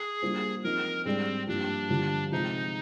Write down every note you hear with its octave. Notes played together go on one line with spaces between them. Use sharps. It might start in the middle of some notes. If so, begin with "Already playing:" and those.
Already playing: G#4
G3 A#3 D4 F4 C5
F3 C4 D#4 A#4
G#2 G3 C4 D4 G#4 D5
G2 F3 A#3 D4
G2 D3 F3
C3 F3 G#3 D#4